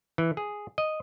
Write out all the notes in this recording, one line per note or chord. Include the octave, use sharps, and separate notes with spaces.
E3
G#4
D#5